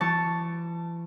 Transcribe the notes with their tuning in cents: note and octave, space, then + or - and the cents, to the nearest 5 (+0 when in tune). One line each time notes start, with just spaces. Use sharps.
E3 +45 A5 +0 C#6 +0